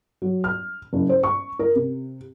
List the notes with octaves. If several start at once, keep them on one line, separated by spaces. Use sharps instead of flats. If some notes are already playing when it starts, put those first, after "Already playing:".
F#3
F6
F#1
C5
C#6
A#4
C3